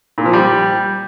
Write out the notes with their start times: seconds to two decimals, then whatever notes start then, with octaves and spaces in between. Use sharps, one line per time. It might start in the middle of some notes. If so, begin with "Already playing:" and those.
0.18 A#2
0.26 F3
0.33 G3